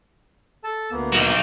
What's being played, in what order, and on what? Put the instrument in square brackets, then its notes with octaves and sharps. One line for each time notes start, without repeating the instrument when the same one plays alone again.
[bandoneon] A4 A5
D2 A#3 B3
[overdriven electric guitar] F#3 D#4